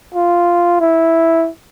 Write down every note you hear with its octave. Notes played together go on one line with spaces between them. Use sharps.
F4
E4